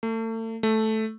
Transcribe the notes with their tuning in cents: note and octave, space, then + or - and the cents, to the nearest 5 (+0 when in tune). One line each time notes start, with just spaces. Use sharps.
A3 +35
A3 -5